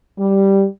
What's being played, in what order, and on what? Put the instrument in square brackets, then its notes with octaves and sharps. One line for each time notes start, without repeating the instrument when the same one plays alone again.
[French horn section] G3